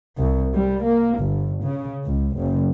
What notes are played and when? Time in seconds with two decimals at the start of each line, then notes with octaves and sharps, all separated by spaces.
0.17 C2
0.53 G3
0.84 A#3
1.19 G1
1.63 C#3
2.06 C#2
2.36 F#1